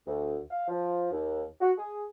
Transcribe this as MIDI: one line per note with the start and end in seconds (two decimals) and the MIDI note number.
0.07 0.38 38
0.51 0.66 77
0.68 1.07 53
1.11 1.44 39
1.61 1.71 66
1.77 2.04 68